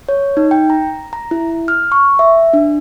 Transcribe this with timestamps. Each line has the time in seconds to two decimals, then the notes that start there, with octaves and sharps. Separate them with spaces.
0.09 C#5
0.37 D#4
0.51 G5
0.70 A#5
1.13 A#5
1.31 E4
1.68 F6
1.92 C#6
2.19 E5
2.53 D4